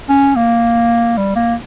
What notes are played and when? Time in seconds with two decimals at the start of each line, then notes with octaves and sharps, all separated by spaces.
0.09 C#4
0.36 A#3
1.17 G3
1.36 A#3